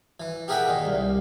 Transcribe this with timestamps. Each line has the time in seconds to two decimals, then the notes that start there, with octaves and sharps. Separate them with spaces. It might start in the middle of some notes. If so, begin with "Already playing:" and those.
0.20 E3
0.48 G4 G#4 A#4 E5 F#5 G5
0.68 A#2 D#3
0.85 C2